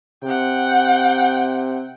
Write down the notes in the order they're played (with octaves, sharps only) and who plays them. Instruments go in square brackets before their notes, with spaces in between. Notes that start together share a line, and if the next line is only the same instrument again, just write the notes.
[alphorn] C3 [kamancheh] F#5 G5